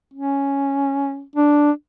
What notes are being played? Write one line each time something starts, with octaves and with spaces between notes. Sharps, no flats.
C#4
D4